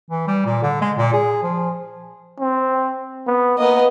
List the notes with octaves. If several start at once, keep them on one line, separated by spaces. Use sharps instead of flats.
E3
G3
A#2
D3
G#3
A#2
G#4
F3
C4
B3
A#3 B3 D#5